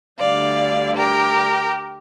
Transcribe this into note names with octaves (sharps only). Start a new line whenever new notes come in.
D2 D3 G3 D5 F5
G4 A#4